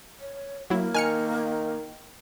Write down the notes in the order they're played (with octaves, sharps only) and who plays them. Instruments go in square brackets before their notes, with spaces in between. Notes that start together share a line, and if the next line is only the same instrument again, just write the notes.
[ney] C#5
[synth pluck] F#3 E4 [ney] A#3
[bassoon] D#3 [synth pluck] G#5 F6 C#7